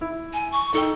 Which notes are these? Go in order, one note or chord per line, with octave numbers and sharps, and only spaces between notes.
E4
G#5
C#6
D#4 A4 G5